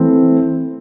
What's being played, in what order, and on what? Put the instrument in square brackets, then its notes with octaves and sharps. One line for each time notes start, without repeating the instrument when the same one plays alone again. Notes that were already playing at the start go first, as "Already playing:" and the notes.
Already playing: [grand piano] E3 A3 C4